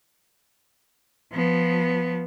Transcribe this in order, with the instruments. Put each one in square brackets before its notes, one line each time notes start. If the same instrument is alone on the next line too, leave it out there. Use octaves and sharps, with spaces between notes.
[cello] F3 B3